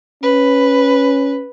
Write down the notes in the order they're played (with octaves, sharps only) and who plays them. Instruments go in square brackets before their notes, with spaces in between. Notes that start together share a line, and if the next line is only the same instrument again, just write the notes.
[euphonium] C#4 [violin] B4